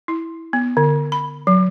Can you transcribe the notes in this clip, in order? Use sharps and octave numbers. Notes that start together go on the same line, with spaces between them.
E4
B3
D3
B5
F#3